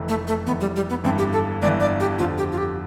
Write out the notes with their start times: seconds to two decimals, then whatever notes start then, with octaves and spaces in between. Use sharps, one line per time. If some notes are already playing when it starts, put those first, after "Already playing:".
Already playing: F1 F2 E3
0.09 A3
0.28 A3
0.47 F1 F2 E3 B3
0.61 G3
0.76 G3
0.90 B3
1.04 G1 G2 E3 C4
1.18 G4
1.33 A4
1.62 G1 G2 E3 D5
1.80 D5
2.00 G4
2.19 F2 D3 F3 F4
2.38 G4
2.52 F4
2.58 G4